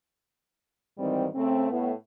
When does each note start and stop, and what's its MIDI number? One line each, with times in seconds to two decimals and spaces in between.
0.98 1.28 44
0.98 1.28 51
0.98 1.28 52
0.98 1.28 55
0.98 1.28 60
1.35 1.68 49
1.35 1.68 57
1.35 1.68 60
1.71 1.91 45
1.71 1.91 59